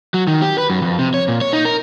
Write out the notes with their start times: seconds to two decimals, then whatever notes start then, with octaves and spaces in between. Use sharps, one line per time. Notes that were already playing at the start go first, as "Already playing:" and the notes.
0.14 F#3
0.27 D#3
0.42 G4
0.58 B4
0.70 F#2
0.82 F2
0.99 C3
1.14 C#5
1.28 A#2
1.41 C#5
1.53 D#4
1.65 A#4